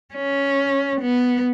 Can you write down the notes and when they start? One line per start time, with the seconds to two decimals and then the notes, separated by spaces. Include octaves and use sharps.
0.15 C#4
1.02 B3